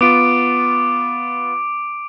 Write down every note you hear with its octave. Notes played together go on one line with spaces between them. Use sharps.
B3 F4 D6 D7